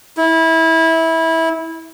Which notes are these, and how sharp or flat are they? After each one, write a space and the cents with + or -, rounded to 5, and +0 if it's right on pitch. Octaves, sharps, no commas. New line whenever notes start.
E4 -20